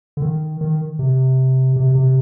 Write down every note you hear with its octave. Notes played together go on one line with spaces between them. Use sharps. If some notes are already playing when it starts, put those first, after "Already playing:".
D3
D#3
D#3
C3
C3
C3